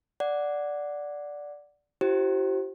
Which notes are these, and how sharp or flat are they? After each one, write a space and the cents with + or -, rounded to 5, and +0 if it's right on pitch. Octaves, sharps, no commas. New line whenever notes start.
D5 -5 F#5 -5
E4 +35 G4 -40 C5 +15